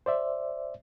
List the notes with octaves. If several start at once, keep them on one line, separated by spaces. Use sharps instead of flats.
C5 D5 E5